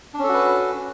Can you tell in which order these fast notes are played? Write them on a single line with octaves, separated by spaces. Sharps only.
D4 C#4 A4 F#4 B4